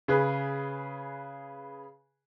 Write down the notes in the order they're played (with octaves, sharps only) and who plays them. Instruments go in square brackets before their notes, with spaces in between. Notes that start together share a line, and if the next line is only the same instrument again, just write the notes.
[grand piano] C#3 G#4 B4